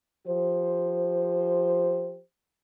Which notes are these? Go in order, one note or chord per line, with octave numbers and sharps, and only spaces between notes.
F3 G4 C5